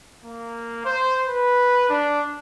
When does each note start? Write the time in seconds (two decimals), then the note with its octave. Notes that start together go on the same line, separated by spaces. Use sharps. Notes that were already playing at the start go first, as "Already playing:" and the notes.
0.25 A#3
0.85 C5
1.28 B4
1.89 D4